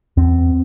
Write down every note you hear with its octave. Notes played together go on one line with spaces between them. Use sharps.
E2 C4